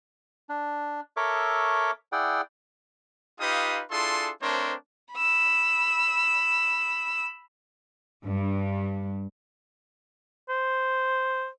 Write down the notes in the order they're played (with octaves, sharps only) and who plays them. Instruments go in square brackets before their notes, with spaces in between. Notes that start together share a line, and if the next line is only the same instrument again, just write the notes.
[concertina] D4
A4 A#4 C#5 E5 C#6 D6
E4 G#4 D5 F#5 G5
[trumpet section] D#4 F4 G4 B4 F5 D#6
D4 E4 F4 G#4 A4 C6
A3 C4 D4 A#4 C5 C#5
[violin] B5 E6
[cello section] G2
[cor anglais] C5